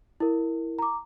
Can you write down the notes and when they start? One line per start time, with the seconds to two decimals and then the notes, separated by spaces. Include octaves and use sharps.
0.20 E4 A#4
0.79 A#5 D6